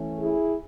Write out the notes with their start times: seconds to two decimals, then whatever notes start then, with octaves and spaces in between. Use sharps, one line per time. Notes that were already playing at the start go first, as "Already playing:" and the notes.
Already playing: E3 A3 C#4
0.19 E4 G#4